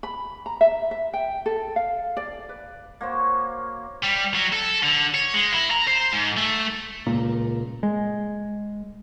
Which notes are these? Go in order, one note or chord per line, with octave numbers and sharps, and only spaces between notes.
B5
A#5
E5
E5
G5
A4
F5
D5
B4
A#3 F#4 C5 C#5
G3
F#3
A4
D3
C#5
G#3
E4
A#5
C5
G#2
A3
C#2 A#2 A#3
G#3